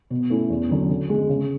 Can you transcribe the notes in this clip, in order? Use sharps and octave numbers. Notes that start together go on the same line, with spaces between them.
B2
A3 C#4 E4
E2
D3 F#3 C#4
D3
G#3 C#4
C#3